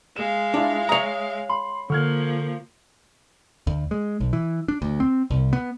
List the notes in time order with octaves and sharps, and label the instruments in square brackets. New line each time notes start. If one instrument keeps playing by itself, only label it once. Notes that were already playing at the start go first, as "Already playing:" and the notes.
[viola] G#3 F5 [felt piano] E7
[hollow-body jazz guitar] D4 [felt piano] E4 F4
[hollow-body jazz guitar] C#5 A#5 [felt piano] E5 D#6
[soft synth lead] B5 [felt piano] C6
[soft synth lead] D3 [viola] F3 A#3 [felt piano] C#6 F6 G#6
[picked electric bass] D2
G#3
B1
E3
D4
D2
C4
C2
B3